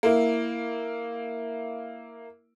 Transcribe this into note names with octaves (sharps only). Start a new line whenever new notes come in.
A#3 E4